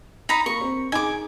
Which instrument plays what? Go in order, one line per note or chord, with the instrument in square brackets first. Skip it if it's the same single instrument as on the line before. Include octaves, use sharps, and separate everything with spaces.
[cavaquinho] D#4 A#5 B5
[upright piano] A#3 [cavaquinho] C#6
[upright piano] C4
[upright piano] D#4 G#4 [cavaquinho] G#5 D6